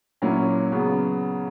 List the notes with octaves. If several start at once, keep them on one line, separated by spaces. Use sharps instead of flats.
A#2 F#3 A#3 C#4 E4
C#3 F#3 B3